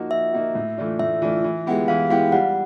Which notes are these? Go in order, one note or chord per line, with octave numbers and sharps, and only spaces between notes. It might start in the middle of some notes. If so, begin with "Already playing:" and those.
Already playing: F3 A#3 D#4 F#4
F3 E5
A#3 D#4 F#4
A2
E3 A3 D4 F4
A2 E5
E3 A3 D4 F4
E3
G#3 B3 E4 G4
E3 F5
G#3 B3 E4 G4 F5
G3 F#5